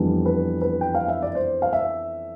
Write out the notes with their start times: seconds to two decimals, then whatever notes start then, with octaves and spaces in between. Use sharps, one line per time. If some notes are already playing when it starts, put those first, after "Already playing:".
Already playing: F2 E3 G3 B3 D4
0.26 B4
0.61 B4
0.81 G5
0.95 F5
1.08 E5
1.22 D5
1.35 C5
1.62 F5
1.73 E5